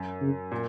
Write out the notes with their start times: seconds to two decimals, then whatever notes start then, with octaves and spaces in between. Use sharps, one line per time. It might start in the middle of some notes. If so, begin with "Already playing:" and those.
Already playing: F#2
0.21 C#3
0.52 A#2